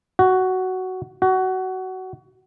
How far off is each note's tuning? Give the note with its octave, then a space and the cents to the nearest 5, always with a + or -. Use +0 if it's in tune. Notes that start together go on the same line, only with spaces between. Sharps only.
F#4 +10
F#4 +20